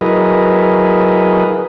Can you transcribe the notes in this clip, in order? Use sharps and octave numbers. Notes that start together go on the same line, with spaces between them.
F#3 E4 G#4 A#4 B4 D#5